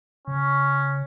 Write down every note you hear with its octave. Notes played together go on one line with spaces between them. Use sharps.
C#3 C#4